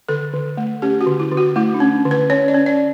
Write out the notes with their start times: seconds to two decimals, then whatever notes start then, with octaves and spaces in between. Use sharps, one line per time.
0.09 D3 A4
0.33 D3
0.57 A3
0.82 C#4 G4
1.01 F#4
1.07 D3
1.20 E4
1.32 D3
1.37 F#4
1.56 A3 E4
1.74 D4
1.80 C#4
2.05 D3
2.11 B4
2.30 C#4 C#5
2.48 D5
2.54 C#4
2.66 D5